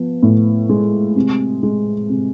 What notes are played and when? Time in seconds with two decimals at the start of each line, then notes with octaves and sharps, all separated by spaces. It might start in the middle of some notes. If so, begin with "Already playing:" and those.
Already playing: F3 B3
0.23 A2
0.69 G#3
1.16 C3
1.63 G#3
2.10 C3